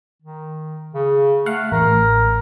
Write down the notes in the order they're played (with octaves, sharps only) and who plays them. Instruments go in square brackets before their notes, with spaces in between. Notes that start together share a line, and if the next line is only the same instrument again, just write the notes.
[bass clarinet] D#3
C#3
[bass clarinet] A3 [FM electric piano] F5 F#5
[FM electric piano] A1 [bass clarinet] A#4